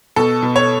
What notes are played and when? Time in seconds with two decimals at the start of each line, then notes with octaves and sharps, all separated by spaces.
0.16 B2 A4
0.43 B2
0.56 C#5